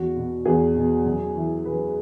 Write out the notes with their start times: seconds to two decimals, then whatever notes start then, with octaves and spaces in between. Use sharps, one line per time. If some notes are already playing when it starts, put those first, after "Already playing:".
Already playing: E2 F#4
0.17 B2
0.46 E2 G#4
0.76 B2
1.05 F#2
1.35 E3
1.65 F#2 B4